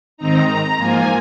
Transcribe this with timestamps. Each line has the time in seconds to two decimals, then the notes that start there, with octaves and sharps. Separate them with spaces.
0.17 G#2 D#3 C4 D#4 A#5
0.47 A#5
0.76 G#2 F3 A#3 F4 G#5